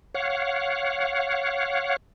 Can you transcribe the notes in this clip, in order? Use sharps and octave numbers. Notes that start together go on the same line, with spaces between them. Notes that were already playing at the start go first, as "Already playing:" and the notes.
C#5 F5 F#5